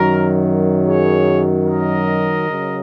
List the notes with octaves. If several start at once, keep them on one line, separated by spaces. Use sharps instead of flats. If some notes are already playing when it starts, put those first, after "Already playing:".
Already playing: F#2 D#3 F#3 F#4 A#4
G#4 C#5
A#4 D#5
C#3 F#3